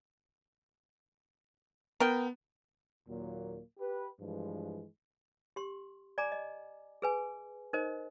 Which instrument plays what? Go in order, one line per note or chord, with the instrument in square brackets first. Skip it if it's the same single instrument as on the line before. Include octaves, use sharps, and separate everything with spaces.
[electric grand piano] B3 [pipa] A#4 G5
[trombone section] D#2 A#2 F#3 A#3
G4 B4
G2 E3 F3 G#3
[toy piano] G4 C6
D5 G#5 A#5 D6
D#5
G#4 B4 G#5
D#4 A#4 C5 D#5